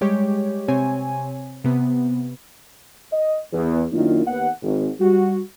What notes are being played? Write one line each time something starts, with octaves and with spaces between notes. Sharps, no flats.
G3 G#3 G4 C#5
C3 C4 C#5 G#5
C3 B3
D#5
E2
F#2 D#3 A#3 D4 E4 F4
D#2 B3 F#5
G#1
G3 F#4